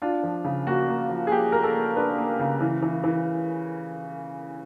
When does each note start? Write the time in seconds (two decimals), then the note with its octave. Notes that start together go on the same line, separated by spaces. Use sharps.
0.02 D4 F4
0.23 F3
0.45 C#3
0.67 A#3 F#4
0.88 A#3
1.10 F3
1.27 G#4
1.31 A#3 G4
1.52 A#3 A#4
1.63 A4
1.74 A#3
1.96 D4 B4
2.18 A#3
2.39 C#3
2.61 E3
2.82 E3
3.04 E3